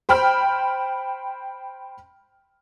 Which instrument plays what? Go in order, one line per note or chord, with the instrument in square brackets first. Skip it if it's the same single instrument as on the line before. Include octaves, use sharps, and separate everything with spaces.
[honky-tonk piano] C5 G5 B5 F6